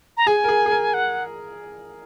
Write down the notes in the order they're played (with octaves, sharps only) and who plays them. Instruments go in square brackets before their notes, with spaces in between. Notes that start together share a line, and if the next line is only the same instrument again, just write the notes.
[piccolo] A#5
[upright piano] G#4 [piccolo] G#5
[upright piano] A#4
G#4
G#4
A#4
[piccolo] F#5